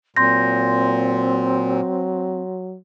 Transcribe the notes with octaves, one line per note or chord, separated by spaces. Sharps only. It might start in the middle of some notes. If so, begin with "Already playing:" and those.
A#2 F#3 C4 C6 G6 A#6